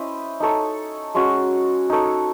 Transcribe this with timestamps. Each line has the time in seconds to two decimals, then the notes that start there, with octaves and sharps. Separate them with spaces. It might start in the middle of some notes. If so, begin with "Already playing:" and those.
Already playing: C#4 E4 C5 D#5
0.40 D#4 A4 C#5
1.15 G#3 C#4 F#4
1.90 D#4 A4 C#5